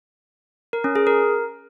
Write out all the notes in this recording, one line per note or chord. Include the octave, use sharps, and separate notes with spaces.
A#4
C#4
G#4
A#4